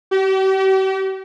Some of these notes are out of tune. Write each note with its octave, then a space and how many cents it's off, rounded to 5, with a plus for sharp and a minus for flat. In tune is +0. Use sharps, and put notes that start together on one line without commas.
G4 -40